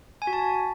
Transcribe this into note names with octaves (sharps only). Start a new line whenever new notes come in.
G#5
F#4
A5